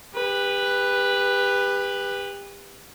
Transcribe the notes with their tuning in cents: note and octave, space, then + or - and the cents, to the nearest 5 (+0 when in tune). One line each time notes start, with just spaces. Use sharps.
G4 +35 B4 +0